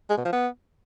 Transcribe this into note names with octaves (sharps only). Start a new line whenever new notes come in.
G#3
B2
F3
B3